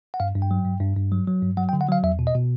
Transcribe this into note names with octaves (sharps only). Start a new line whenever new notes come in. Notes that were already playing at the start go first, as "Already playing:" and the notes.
F#5
G2 F5
G2
G5
F#3
G2
G2
G2
F#3
F#3
G2
F#3 F#5
G5
D3
F#5
F#3 F5
E2 E5
B2
D#5
B2